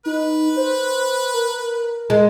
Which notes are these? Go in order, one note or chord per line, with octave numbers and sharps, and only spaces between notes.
D#4 B4
C5
A#4
G#3